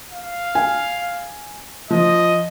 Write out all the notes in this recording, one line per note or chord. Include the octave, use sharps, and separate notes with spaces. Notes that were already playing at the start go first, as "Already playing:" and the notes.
F5
G#5
F3 D#5